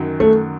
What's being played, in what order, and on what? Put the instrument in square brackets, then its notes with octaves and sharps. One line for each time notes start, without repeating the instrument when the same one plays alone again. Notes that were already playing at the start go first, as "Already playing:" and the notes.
Already playing: [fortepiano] F#2 D#3 F#3
[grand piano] A3